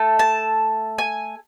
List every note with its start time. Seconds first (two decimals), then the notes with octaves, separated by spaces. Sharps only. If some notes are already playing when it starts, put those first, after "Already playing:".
Already playing: A3 A4
0.19 A5
0.98 G#5